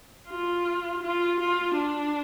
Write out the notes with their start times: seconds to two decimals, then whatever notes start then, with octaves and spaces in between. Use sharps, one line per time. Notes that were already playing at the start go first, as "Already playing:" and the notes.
0.29 F4
1.03 F4
1.40 F4
1.77 D4